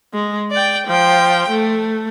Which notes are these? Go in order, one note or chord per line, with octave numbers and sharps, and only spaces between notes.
G#3
D5 G5
F3 G5
A3